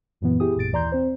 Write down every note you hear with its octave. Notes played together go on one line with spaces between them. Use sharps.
G#1 F#2 A#2 E3 B3
E4 G4 G#4 D#6
A1 F#2 A#2 A6 D7
D#2 E3 D5 A#5 C6 G6
C4 C5